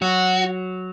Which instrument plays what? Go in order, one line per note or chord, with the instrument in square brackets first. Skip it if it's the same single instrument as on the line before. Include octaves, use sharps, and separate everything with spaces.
[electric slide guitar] F#3 [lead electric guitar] F#4